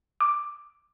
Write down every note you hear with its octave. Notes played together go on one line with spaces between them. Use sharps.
D6